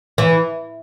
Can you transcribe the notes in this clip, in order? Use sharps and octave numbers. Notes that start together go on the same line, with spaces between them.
E3